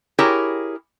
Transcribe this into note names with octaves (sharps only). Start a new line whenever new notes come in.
E4 G4 G#4 A#4 C#5